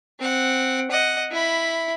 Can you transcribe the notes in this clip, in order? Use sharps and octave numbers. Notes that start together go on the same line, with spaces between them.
C4 F#5
D#5 F#5
E4 B5